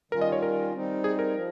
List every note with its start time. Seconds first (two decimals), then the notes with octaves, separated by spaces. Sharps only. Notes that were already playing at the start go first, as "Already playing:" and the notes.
0.12 D#3 G3 C#4 F4 A#4
0.21 D#5
0.32 C#5
0.42 A#4
0.73 G3 C4 D#4
1.04 G#4
1.19 A#4
1.34 F3